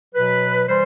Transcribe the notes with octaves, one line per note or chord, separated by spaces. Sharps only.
B2 F#3 B4
E3 G3 C5